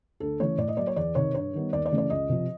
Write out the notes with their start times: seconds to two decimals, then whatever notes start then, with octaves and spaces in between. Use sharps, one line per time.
0.20 D2 A4
0.40 C#3 E3 A3 C#5
0.58 A2 D5
0.68 D#5
0.77 F#3 A#3 D5
0.87 C#5
0.96 E2 D5
1.15 C3 D#3 C#5
1.34 G2 C#5
1.53 D#3 G3 B3
1.73 D#2 D5
1.86 D5
1.91 C#3 E3 A3
1.98 D5
2.10 C#2 D#5
2.29 C3 F3